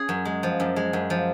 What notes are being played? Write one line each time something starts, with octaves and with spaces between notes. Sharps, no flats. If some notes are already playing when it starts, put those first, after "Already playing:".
Already playing: C#4 G#4
F#2
G#3
F3
F#2
G#3
F#2
F3